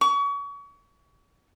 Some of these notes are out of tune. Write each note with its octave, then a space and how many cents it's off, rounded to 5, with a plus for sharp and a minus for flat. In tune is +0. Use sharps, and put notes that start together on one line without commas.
C#6 +35